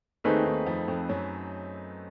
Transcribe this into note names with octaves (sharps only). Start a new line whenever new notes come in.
D#2 D#3 A3 C4 D#4 G#4 B4
D#2 D#3
F2 F3
F2 F3
F#2 F#3